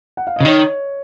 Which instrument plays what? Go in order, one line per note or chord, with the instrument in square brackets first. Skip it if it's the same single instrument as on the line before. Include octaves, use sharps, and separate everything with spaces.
[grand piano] F#5
F5
[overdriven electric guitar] C#3 [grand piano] D#5
[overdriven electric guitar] D#3 [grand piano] C#5